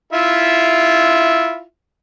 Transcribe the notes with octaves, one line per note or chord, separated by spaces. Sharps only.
E4 F4 E5